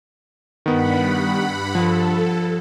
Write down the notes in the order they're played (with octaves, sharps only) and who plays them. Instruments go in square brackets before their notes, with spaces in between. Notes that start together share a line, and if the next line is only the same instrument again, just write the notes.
[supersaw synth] G2 F#5 B5 [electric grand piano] D#3 B3
[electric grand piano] F3 [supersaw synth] A4